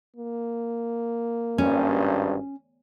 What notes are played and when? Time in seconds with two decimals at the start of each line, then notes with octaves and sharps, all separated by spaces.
0.16 A#3
1.58 G#1 G2 C#4